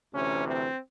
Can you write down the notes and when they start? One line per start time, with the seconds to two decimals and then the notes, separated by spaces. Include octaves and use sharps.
0.14 D2 C3 E3 C#4
0.47 C4